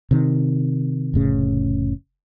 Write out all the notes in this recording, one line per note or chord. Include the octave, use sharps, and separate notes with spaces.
C3 D#3
F1 A2 C#3